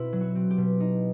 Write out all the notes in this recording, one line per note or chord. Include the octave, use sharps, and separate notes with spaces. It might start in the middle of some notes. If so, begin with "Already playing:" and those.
Already playing: B2 C4 E4 B4
F#3
F#4
C4
G4
B2
D#4